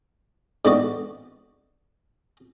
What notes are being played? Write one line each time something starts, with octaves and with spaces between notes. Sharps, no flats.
G#2 D3 E3 B3 F#4 D6